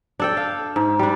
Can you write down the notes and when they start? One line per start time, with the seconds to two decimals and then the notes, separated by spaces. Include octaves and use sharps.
0.20 D4 A4 G5
0.37 F5
0.76 G#2
0.99 G3 D4